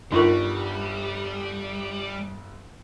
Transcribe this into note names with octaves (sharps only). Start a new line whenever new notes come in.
G1 G3 D4 D#4 F4 A#4 C#6